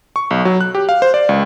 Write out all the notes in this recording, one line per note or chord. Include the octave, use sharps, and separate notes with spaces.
C#6
B1
F#3
F#6
G4
F5
C5
D5
C#2